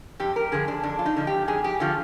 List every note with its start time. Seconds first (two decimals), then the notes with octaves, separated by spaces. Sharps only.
0.20 F2 G4
0.36 A#4
0.52 D3 F3 G#4
0.68 D4
0.83 F2 D4
0.99 F4
1.06 D#4
1.16 D3 F3
1.27 G4
1.48 F2 G#4
1.64 G4
1.80 D3 F3 F4